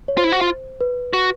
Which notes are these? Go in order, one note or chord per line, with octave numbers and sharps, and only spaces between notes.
C#5
F4 C5
E4
F#4
F4
B4
F#4